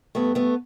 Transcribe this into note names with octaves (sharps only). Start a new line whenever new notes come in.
G2 A3 B3
A3 B3